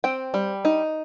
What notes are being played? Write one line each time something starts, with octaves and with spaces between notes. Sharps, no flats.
C4 G5
G3
D#4